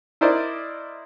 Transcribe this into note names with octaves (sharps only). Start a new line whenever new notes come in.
E4 A#4 C5 D5 D#5